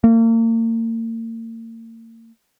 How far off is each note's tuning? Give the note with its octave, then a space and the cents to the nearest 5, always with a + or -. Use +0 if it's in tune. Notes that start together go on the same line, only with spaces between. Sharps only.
A#3 -40